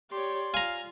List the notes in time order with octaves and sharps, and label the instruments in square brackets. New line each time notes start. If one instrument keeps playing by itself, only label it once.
[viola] G4 C#5 [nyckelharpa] D5 C6
[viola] F4 [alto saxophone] F5 [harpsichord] G#5 A#5